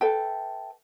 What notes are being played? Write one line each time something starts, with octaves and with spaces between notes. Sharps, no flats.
A4 B4 E5 G5